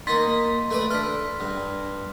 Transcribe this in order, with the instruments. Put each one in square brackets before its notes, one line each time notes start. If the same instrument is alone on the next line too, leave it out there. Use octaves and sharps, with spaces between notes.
[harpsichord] A#3 D#4 [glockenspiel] C6 A6 B6
[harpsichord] A3 B4 D5
[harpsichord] D4 A4 [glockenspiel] F6 B6
[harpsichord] G2